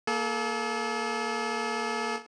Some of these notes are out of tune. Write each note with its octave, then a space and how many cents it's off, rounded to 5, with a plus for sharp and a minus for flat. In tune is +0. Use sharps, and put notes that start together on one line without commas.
A#3 +0 A4 -40